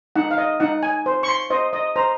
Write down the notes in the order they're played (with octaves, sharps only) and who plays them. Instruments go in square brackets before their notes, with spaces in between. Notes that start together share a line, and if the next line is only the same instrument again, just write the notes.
[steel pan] D#4 F#5
F5
D#5
D#4 F#5
G#5
C5
C#6
C6
C5 D#5
D#5
C5 A#5